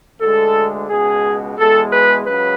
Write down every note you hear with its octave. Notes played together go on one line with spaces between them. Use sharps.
D2 D3 G#3 A4
C#2 B2 G#3 G#4
E2 B2 G#3 A4
B4
C#2 C#3 F#3 B4